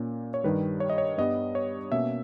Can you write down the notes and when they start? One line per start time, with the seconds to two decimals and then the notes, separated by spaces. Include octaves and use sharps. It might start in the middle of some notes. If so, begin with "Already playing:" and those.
Already playing: A#2 A#3 C#4
0.34 C#5
0.44 G2 D#3 G3 B4
0.80 C#5
0.90 D#5
0.98 C#5
1.18 G2 G3 B3 D#5
1.55 C#5
1.92 B2 A#3 C#4 E5